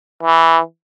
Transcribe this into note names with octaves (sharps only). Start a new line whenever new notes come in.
E3